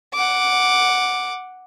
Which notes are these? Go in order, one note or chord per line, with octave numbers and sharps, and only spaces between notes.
F#5 D6